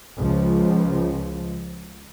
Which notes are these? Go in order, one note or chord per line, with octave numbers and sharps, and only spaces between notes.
C#2 F3